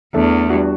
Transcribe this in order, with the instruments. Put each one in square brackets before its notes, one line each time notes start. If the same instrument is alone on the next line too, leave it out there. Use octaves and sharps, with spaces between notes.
[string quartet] E2 [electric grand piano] A3 D4 A4 E5
[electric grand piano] G3 D4 F#4